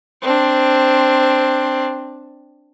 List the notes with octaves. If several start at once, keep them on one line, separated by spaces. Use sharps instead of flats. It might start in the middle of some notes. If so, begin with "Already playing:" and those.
C4 D4